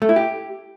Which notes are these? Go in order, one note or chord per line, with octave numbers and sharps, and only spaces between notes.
A3
E4
G4